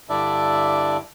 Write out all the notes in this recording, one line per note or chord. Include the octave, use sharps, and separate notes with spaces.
G2 D3 D4 E4 D5 E5